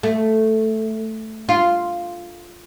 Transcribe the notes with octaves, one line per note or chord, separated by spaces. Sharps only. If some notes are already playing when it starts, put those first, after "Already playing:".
A3
F4